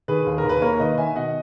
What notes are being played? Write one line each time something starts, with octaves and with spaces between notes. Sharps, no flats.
D#3 G#4 B4
D#2
A#4
D#2
B4
A#3 A#4 C#5
D#3 B4 D#5
D#3 E5 G#5
B2 D#5 F#5